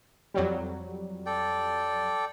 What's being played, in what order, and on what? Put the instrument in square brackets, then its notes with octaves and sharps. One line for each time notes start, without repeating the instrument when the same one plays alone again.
[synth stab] F2 F#3 G3
[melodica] A4 D5 G5